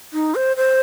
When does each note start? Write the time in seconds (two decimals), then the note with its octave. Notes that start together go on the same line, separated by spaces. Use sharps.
0.13 D#4
0.35 C5
0.57 C5